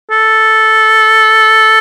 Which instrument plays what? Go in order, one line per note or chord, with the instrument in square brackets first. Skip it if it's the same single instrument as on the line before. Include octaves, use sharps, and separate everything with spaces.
[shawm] A4